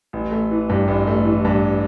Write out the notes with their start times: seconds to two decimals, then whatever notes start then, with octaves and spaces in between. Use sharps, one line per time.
0.13 A1
0.31 A3
0.51 E3
0.69 G2
0.88 A1
1.07 A3
1.25 E3
1.45 G2